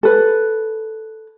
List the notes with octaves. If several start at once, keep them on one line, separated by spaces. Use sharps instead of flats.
A4 B4